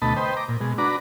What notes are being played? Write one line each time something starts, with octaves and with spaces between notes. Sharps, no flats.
D2 B2 A3 D#5 A5 B5
B4 C5 D#5 G5
A#5 D6
A#2
B2 G#3
D4 F#4 B4 D5 A#5